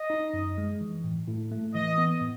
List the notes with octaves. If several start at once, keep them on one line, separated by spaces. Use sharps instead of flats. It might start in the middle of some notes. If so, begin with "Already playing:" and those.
Already playing: D#5
D#4
F#2
G#3
E3
A2
A2
A3
E3 D#5
B3
A2